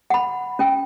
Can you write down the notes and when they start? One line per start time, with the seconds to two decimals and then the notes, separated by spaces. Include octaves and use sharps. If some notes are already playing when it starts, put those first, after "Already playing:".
0.10 F#5 B5
0.59 C#4 G5